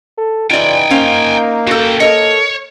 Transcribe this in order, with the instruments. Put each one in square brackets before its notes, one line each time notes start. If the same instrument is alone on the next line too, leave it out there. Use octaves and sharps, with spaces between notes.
[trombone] A4
[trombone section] C#3 E3 [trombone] D#4 [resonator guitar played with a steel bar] F4 D5 [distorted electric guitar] G5 G#5
[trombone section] A#3 [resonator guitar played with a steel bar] C#4 C5 F5
[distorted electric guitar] C#3 G5 [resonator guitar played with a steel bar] F#4 A4
[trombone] A4 [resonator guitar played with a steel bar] A#4 D#5 [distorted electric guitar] C#5